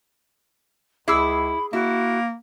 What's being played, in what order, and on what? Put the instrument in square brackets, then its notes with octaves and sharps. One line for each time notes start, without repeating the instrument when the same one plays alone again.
[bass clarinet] C#2 [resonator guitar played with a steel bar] E4 [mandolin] G#4 D6 E6 [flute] B5
[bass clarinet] A#3 [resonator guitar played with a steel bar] E4 [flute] F#4